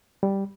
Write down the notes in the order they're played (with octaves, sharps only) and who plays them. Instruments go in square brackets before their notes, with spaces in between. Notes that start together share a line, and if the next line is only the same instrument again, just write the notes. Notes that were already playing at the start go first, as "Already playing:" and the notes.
[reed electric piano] G3